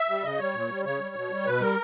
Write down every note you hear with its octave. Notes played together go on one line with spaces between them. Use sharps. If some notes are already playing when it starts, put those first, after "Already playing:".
Already playing: E5
G3
C#3 D#5
G3 C#5
A#2
G3
C#3 C#5
G3
B2
G3
B2 B4
G3 A#4